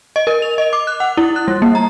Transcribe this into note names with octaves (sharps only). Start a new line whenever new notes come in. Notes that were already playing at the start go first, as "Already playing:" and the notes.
D#5
A#4
F7
D#5
D6
F#6
F#5
E4
F#6
G3
A#3
A#5